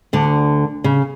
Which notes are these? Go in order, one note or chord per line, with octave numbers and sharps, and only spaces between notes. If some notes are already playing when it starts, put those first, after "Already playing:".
D2 D3
C#3